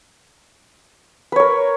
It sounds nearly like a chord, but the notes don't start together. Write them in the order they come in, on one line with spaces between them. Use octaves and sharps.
B4 C#5 A#4